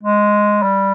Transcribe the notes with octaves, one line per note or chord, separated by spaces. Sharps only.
G#3
G3